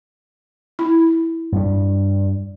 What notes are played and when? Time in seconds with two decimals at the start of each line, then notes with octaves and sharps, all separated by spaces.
0.79 E4
1.52 G2 G3